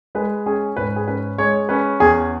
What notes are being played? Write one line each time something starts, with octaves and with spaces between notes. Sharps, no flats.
G#3 B4
C#4 G#4
G#2 B4
G#4
C#4 B4
G#3 C#5
C#4 B4
E2 G#4